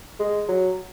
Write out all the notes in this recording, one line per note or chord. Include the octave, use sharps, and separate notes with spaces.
G#3
F#3